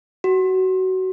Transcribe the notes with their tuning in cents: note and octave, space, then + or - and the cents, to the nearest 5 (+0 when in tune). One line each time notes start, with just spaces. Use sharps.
F#4 +20